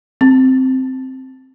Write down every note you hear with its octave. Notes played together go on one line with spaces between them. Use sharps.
C4